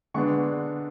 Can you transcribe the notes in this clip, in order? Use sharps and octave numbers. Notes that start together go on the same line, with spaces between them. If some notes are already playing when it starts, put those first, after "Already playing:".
D3 G#3 B3 D4 C#6